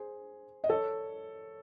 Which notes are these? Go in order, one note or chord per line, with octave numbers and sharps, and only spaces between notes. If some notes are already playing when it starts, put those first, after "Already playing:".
Already playing: G#4 C5
D#5
A4 C#5